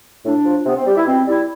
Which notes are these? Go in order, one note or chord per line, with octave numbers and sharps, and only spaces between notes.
A2 D4
F3
C3 B3
C4
G3 G4
E4
B2 C4
G3 E4